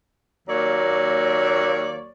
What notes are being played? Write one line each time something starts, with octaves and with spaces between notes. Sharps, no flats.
D#2 F#3 A#3 C#5 D5